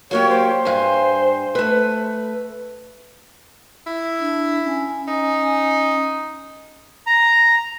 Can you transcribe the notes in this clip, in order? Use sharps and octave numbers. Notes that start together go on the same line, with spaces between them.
F#3 A#3 G4 C#5
C5
G2 G#5
A3 B4
E4
D4
C#4
D#4
A#5